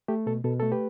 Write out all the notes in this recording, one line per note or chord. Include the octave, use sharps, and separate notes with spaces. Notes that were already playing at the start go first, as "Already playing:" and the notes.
A3 G4
B2 A4
B2 A4
A3 A4
G4 B4